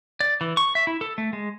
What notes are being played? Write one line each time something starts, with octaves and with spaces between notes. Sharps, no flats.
D5
E3
C#6
E5
E4
A4
A3
G#3